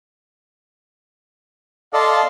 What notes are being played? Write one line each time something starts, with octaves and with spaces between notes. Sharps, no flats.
A4 D5 D#5 F5 A5 C6